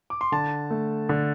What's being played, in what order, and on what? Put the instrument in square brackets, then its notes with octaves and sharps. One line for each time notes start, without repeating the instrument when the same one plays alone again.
[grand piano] D6
C6
D3 A5
A3
D3